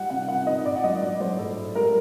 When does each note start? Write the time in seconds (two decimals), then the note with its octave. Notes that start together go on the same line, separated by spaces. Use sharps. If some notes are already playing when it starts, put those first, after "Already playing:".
Already playing: G3 F#5
0.10 C3 F#5
0.28 C3 F#5
0.47 D#3 D#5
0.65 A#2 D5
0.76 F#5
0.84 F#3 D#5
1.02 F#3 D5
1.20 F#3 C5
1.39 A2 A4
1.57 A2
1.75 G3 A#4